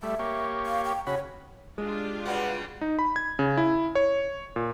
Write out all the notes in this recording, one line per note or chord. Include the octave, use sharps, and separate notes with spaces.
G3 A3 E5
A#3 G4 C#5
F5
G5
C#3 F#4 C#5 B5
G#3 D4 F4 G4
C#3 G3 F#4 B4 D5 F#5
D#4
B5
G#6
C#3
E4
C#5
A#2